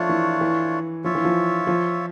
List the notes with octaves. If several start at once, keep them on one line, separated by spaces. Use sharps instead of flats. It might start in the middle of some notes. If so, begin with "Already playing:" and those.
Already playing: F3 A3 D4 F4 C#5
E3
E3
F3 F4 C#5 E5
E3
F3
F3